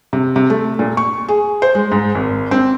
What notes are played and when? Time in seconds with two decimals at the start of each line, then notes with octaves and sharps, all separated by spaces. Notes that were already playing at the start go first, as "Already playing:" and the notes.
0.13 C3
0.36 C3
0.50 A3
0.79 A#2
0.97 C#6
1.29 G#4
1.62 C5
1.75 G#3
1.92 G#2
2.15 G#1
2.51 C4